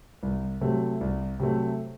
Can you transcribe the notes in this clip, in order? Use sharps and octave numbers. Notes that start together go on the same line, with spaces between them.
C2
C3 F#3 A3
C2
C3 F#3 A3